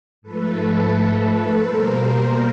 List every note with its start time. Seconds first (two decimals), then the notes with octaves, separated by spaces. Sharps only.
0.22 G#2 F3 A3 A4 B4
1.57 B2 G3 A#3 A#4 C5